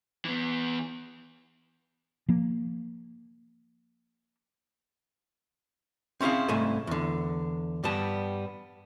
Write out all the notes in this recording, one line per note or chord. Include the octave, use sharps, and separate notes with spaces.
E3 B3
F3 A#3
C4 C#4 E4 G#4 F5
C2 G#2 A3 E4 E5 G#5
E2 D3
G2 G3 B3 A5